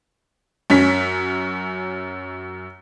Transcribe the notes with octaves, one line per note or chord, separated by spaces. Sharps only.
F#2 C#4 B6